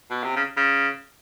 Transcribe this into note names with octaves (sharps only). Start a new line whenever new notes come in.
B2
C3
C#3
C#3